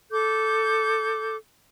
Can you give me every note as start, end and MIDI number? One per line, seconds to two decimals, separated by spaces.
0.11 1.36 69
0.11 1.36 86
0.11 1.36 91